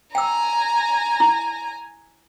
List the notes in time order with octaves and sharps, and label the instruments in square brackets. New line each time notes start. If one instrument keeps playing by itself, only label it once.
[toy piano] G5 E6 [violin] G#5 A#5
[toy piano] E4